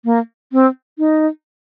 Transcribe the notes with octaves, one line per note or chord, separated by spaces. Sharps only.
A#3
C4
D#4